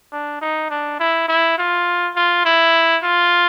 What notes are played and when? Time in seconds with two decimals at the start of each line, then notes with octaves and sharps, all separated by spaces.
0.12 D4
0.41 D#4
0.70 D4
1.00 E4
1.28 E4
1.58 F4
2.16 F4
2.45 E4
3.03 F4